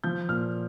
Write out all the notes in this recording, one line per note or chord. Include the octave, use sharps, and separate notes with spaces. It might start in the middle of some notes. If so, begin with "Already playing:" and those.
F3 G6
A#2 F6